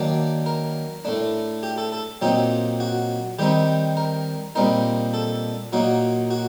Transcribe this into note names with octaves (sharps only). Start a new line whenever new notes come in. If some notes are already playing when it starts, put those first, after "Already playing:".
Already playing: D#3 F#3 A#3 D4 D5
A#4
A2 A3 D4
G4
A4
A4
A#2 F#3 C4 D#4 G4
F#4
D#3 G3 C4 D#4 G4
A#4
A#2 G3 C4 D#4 A#4
A4
A#2 F#3 A#3 D#4 F#4
F#4